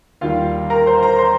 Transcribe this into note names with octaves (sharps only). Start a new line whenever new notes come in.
D#2 D#3 G3 F4 F5
A#4 A#5
C5 C6
A#4 A#5
C5 C6